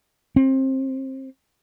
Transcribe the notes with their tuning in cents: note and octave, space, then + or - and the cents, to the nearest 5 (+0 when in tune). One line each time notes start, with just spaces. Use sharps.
C4 +25